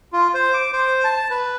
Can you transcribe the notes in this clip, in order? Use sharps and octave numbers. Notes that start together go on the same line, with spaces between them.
F4
C5
D6
C5
A5
B4